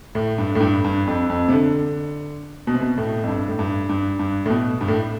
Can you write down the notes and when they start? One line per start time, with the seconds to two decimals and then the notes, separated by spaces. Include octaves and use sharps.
0.15 A2
0.38 G2
0.55 A2
0.60 G2
0.84 G2
1.07 F2
1.30 F2
1.48 C3
1.53 D3
2.67 B2
2.74 C3
2.81 B2
2.98 A2
3.24 F2
3.28 G2
3.48 A2
3.59 G2
3.89 G2
4.19 G2
4.46 A2
4.50 B2
4.81 G2
4.88 A2